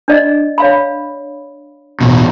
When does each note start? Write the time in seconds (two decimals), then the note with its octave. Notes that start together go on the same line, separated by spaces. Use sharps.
0.08 D4 D5 D#5
0.58 C#5 F5 B5
2.01 E1 A1 B2